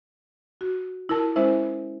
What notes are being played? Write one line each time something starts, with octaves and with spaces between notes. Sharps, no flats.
F#4
E4 F4 A#4 A5
G#3 C#4 E4 C5 E5